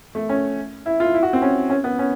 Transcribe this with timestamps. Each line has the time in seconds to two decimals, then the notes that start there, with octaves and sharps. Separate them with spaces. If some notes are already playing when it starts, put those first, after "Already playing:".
0.15 A3
0.29 C#4
0.86 E4
1.00 F4
1.14 E4
1.23 F#4
1.33 C4
1.42 C#4
1.70 C#4
1.84 B3
1.99 C#4